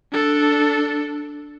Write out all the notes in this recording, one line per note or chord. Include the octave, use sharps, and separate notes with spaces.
D4 A4